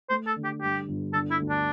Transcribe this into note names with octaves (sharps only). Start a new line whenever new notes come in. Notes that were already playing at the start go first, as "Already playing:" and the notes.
A3 C5
A4
D3
G4
G2 G4
G1
D3 A4
E4
D2
D4